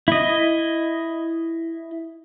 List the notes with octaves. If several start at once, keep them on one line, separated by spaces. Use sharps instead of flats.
E4 D#5